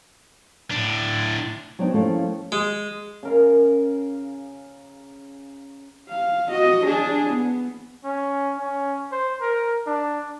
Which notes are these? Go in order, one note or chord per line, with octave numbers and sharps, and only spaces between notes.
A2 D4
F#3 B3 C4 D4 D#4
F3 G3 A3 A#3 C#4 E4
G#3
C#3 A#4 F5
F5
F#4 D#5
D4 G#4
B3
C#4
C#4
C5
A#4
D4